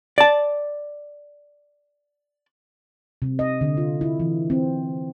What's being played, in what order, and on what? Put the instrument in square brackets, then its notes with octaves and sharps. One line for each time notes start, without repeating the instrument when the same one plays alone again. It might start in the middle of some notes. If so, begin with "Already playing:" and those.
[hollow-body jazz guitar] D5 A5
[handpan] C3
D#5
D3
F4
E4
E3
C4